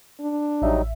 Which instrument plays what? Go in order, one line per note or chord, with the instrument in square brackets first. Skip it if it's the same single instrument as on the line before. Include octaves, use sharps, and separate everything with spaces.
[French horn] D4
[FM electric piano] A1 E5 [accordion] F#3 G3 D#4